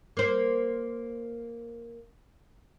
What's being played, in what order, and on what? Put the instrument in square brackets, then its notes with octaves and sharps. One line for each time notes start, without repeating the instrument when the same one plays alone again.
[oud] A#3 C5